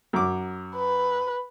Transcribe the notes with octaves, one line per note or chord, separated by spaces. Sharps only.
F#2 D6
B4